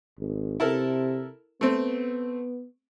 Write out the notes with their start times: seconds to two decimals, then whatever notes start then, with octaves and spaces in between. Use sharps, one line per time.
0.19 G#1
0.60 C3 E4 A4 A#4
1.61 A3 B3 C4